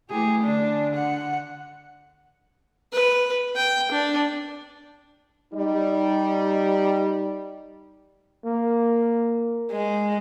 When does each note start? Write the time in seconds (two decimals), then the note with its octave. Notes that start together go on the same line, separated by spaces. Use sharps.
0.10 E3 A3 G4 G#4
0.44 D3 D4
0.95 F#5
2.93 B4
3.56 G5
3.92 D4
5.53 G3 D#4
8.45 A#3
9.71 G#3